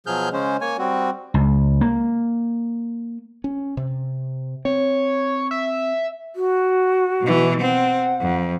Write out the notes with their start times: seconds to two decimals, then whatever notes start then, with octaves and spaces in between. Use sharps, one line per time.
0.07 B2 F3 F#3 G#4 F6 G6
0.33 C#3 G#3 C#4 C5
0.61 A#3 C#5 G#5
0.78 G3 C4 F#4
1.34 C#2
1.81 A#3
3.44 C#4
3.77 C3
4.65 C4 C#5
5.51 E5
6.36 F#4
7.22 B2 E3
7.61 C4 F#5
8.21 F2